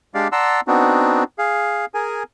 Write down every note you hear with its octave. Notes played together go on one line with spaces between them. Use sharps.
G#3 D4 G4 D5 F5
D5 F#5 A5 A#5 C6 E6
B3 C4 D4 D#4 F#4
G#4 F5
G#4 A#4 G#5